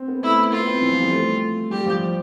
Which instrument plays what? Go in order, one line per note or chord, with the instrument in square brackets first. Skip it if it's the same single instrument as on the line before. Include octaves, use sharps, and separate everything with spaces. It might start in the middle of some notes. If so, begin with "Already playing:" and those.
Already playing: [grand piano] C4
B3
[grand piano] A3 [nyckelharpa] E4
[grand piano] B3 [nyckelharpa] F4
[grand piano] C4
E3
F3
G3
A3
[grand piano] G3 [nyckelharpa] G4
[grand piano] F3